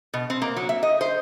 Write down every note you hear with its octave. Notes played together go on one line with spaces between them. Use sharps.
B2
C4
A#3
F#3
E5
D#5
C5